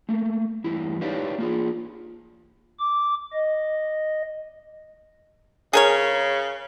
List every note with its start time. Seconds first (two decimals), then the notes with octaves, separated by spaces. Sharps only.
0.09 A3 A#3
0.64 E2 G2 E4
1.01 D#4 G4 B4 C#5 D5 F5
1.38 A#3 F4 G#4
2.79 D6
3.33 D#5
5.73 C#3 G#4 A#4 C#5